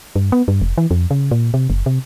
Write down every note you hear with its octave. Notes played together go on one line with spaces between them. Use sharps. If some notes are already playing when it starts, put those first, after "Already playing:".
G2
B3
G2
F1
E3
F2
C#3
A#2
C3
F#1
C3